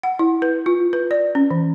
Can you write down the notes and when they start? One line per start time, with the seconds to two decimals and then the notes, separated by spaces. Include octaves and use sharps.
0.03 F#5
0.19 E4
0.42 B4
0.66 F4
0.93 B4
1.11 D5
1.35 C#4
1.51 E3